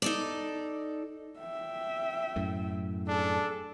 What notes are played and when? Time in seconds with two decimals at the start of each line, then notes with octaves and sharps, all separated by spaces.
0.02 D#4 A4 D5
1.39 E5 G5
2.36 F#2 A2
3.08 D4 G#4 A4